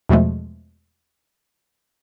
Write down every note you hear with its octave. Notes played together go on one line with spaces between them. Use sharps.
E2 B2 F3 G#3 A3